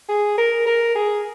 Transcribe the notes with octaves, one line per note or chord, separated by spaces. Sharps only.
G#4
A#4
A#4
G#4